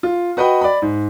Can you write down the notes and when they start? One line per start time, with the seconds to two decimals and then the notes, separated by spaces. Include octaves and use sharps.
0.03 F4
0.37 F#4 B4 D#5 G5 B5
0.61 D5 B5
0.82 G#2